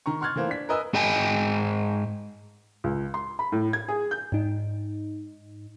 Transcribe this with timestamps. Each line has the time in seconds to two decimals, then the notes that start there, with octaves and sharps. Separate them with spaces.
0.06 D#3 A#5 C#6
0.21 C6 C#6 F6 F#6 G#6 A6
0.36 E3 A3 A#3 C5
0.48 D4 B6
0.69 A#4 B4 D#5 G#5 E6
0.94 G#2 G#4 D#5 G5 G#5
2.84 C#2
3.14 C6
3.39 B5
3.52 A2
3.73 G#6
3.88 G#4
4.11 G6
4.32 G#2 D#4